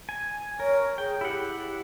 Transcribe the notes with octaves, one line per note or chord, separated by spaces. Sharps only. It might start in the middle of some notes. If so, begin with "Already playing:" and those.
G#5
A#4 C#5
G#4 G5
E4 G4 F#5